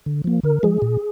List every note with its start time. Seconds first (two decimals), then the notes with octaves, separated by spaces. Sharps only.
0.06 D3
0.24 F3 A#3
0.43 D3 A#4
0.63 F3 G#3 G#4
0.82 A#2